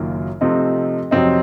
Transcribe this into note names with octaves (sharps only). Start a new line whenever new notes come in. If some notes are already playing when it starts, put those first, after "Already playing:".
Already playing: F#1 F#2 D#3 A#3 F4
C3 F3 A3 C4 D#4
F2 C3 F#3 C4 D#4